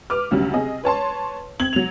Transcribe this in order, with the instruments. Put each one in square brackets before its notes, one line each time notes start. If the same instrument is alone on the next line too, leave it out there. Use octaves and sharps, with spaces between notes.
[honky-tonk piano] B4 D6 F6
D2 C#3 F#3 G3
C3 G#4 D#5
B4 C#5 A5 C6
C4 G#6 F#7
F#3 F7